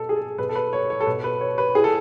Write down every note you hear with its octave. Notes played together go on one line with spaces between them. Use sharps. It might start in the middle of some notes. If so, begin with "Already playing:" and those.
Already playing: B2 A4
G#4
A4
B2 B4
A4
B4
C#5
C#5
A4
B2 B4
B4
C#5
B4
A2 G#4
A4